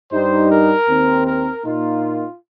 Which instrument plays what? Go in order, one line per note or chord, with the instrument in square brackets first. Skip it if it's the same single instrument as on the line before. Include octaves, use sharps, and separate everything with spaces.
[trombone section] G2 G3 D#4 [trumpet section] C5
[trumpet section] A#4
[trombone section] D#2 D#3 C4
[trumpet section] A#4
[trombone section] A#2 A#3 D#4 [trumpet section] F4